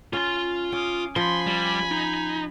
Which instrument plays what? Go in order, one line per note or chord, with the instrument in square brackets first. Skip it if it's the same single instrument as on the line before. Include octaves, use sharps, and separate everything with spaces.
[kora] C#4 [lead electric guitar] F4 C6
[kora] C#4 [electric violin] D6 D#6
[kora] F3 [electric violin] G#5 B5 [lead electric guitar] C6
[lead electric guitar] G3
D#4